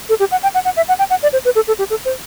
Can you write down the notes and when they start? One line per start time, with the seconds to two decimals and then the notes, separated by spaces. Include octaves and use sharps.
0.09 A4
0.20 G4
0.31 F#5
0.43 G5
0.54 F#5
0.65 F#5
0.76 E5
0.88 F#5
0.99 G5
1.10 F#5
1.23 D5
1.33 C5
1.45 B4
1.55 A4
1.68 A4
1.79 G4
1.90 A4
2.05 C5